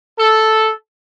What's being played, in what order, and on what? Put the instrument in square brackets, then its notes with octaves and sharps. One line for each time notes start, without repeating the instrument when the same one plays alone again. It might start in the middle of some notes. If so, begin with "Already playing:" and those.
[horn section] A4